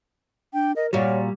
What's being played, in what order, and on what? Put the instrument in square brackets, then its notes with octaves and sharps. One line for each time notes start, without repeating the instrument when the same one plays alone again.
[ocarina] D4 [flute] G5
[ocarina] A#4 [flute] D#5
[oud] A#2 F#4 [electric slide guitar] G3 [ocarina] C#5 [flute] D5